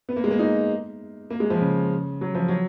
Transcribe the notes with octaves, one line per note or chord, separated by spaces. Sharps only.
B3
A#3
G#3
A#3
D#4
A#3
G#3
F3
C#3
F#3
F3
F#3